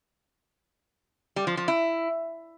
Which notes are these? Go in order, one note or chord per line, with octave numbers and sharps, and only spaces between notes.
G3
F3
F3
E4